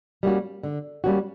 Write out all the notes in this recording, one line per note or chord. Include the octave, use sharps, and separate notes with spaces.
G3 A#3 C#4 F#4
D3
G3 A#3 C#4 F#4